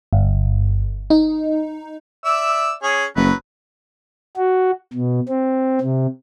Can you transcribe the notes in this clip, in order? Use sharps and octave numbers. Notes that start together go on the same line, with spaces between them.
G1
D#4
D5 E5 E6
C#4 G#4 C#5
F#1 F#3 B4
F#4
B2
C4
C3